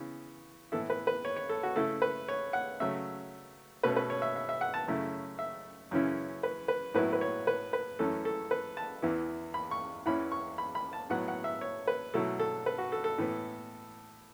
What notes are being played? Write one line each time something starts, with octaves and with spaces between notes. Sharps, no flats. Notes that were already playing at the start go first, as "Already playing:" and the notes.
Already playing: C#3 E3 B3
A2 E3 B3 E4 A4
B4
B4
C#5
C#5
A4
F#4
C#3 A3 E4 A4
B4
C#5
F#5
C#3 F#3 A3 E5
B2 A3 C#4 B4
B4
C#5
E5
E5
E5
F#5
A5
F#2 C#3 A3 E4
E5
F#2 C#3 E3 C#4 E4
B4
B4
A2 F#3 B3 E4 B4
B4
C#5
B4
B4
F#2 E3 A3 C#4 A4
A4
B4
A5
E2 E3 B3 E4
B5
C#6
E2 E3 C#4 E4 B5
C#6
B5
B5
A5
A2 F#3 B3 F#5
F#5
E5
C#5
B4
B2 F#3 A3 E4 A4
A4
B4
F#4
A4
A4
A2 E3 B3